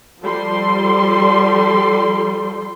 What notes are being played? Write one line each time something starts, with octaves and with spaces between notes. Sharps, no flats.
F3 G3 A4 C6